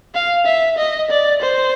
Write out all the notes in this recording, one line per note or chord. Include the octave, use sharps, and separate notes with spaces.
F5
E5
D#5
D5
C5